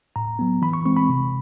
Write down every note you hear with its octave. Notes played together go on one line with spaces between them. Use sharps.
A2 A#5
F#3 B3
E3 B5
C#6
G#3 C4 C#6
B5
C3